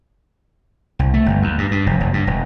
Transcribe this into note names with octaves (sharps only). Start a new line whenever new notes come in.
C2
A3
G1
D#2
G2
G2
F1
F#1
G2
E1